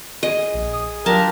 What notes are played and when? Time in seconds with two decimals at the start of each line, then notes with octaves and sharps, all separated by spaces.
0.23 G#4 D#5
0.54 A#1
0.73 D#6
1.06 F#3 D4 F4 G4 A#4 A5